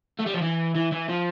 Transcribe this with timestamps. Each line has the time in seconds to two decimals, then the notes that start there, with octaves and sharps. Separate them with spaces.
0.19 A3
0.26 G3
0.34 F3
0.42 E3
0.75 E3
0.92 E3
1.09 F3